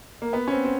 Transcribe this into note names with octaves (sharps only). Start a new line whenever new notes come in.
A#3
B3
C#4
C4
C4